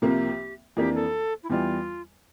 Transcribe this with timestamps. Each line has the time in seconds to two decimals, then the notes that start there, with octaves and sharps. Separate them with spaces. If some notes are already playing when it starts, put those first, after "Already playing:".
0.02 C2 C3 F3 A#3 G4
0.76 F2 E3 A#3 D4 G4
0.94 A4
1.43 E4
1.50 E2 E3 G3 F4